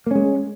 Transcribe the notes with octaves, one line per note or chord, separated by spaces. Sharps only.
G#3 A#3 C#4